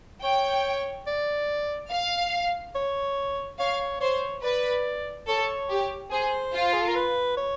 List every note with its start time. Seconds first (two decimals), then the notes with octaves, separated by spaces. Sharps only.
0.23 C#5 G5
1.07 D5
1.91 F5
2.76 C#5
3.59 C#5 F5
4.01 C5 C#5
4.43 B4 D5
5.28 A4 C#5
5.69 G4
6.11 G#4 C5
6.53 F4
6.73 G#4
6.81 A4
6.88 A#4
6.95 B4
7.37 C#5